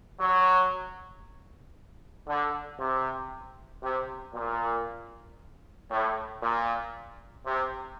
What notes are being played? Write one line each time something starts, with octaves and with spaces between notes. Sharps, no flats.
F#3
D3
C3
C3
A#2
A2
A#2
C3